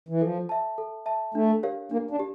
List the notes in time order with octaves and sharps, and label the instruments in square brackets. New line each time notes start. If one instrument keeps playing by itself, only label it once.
[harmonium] E3
[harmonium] F3 [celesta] A4
[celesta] E5 A5
A4
E5 A5
[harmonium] A3 [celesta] D4
[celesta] G4 A#4 C#5 F5
[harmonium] A#3 [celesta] D4
[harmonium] D4
[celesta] G4